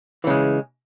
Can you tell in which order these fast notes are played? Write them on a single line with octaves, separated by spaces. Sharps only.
E3 C#3 G#3